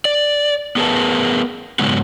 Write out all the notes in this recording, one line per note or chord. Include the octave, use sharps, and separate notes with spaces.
D5
B3 G#4 A#4 B4 A5
G#2 C#3 F#3 G#3 B3 F#4